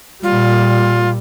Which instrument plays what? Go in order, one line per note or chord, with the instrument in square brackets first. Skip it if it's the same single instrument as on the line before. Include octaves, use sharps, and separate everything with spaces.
[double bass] A#2 G3 [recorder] F4